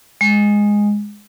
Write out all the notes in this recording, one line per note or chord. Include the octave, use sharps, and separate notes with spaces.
G#3